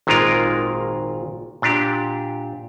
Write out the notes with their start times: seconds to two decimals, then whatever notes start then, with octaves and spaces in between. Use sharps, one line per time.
0.07 G#1 A#2 D#3 G#3 F4 A#4
1.62 A#2 D4 G4